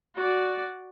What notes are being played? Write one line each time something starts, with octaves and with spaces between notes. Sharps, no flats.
F#4 D5